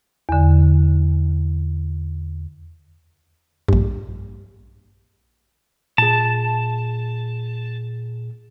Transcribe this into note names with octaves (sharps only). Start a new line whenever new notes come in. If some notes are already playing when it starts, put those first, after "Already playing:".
E2 D3
A#1 G2
A#2 G#4 A5